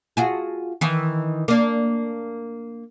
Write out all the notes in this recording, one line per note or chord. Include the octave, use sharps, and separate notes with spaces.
F4 F#4 G#4
D#3 E3
A#3 D4